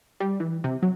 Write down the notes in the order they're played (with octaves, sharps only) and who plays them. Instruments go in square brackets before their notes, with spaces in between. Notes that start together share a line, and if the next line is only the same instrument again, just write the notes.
[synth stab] G3
E3
C3
F#3